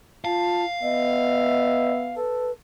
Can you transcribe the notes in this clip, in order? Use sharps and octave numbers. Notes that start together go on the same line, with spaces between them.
F4 F5 A5
B3 D#5 E5
A4 B4